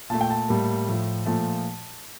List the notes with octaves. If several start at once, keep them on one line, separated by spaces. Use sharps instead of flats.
A#2 A3 A5
G5
A5
A2 G3 A#3
A2 F3 A3
A#2 F3 A3 A5